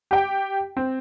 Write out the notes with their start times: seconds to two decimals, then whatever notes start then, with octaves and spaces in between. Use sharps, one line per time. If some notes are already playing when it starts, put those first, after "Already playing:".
0.11 G4 G5
0.77 C4